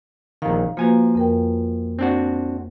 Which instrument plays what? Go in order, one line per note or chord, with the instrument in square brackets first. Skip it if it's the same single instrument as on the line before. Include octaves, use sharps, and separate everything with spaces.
[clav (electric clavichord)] A#1 D#3 [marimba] F5 A#5
[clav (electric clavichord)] F3 G#5 A#5 [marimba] A#3 F#4 B4
[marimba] F2 A#4 G5
[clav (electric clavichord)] C4 D4 F#4